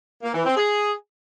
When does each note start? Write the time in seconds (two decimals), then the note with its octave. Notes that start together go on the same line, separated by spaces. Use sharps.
0.22 A#3
0.34 E3
0.46 C4
0.57 G#4